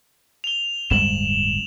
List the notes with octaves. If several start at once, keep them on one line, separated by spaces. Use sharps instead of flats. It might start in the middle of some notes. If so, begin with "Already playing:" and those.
F7 G7
D1 G2 G#3 E7 F#7